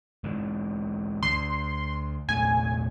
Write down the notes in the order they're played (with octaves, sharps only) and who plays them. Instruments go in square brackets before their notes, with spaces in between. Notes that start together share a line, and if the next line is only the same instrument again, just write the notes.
[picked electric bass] G#2 E3
[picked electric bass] D2 [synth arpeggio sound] C6
[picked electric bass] E2 A#2 A3 [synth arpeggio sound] G#5